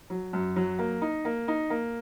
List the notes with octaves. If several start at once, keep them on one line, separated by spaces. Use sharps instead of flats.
F#3
F#2
F#3
A#3
D#4
A#3
D#4
A#3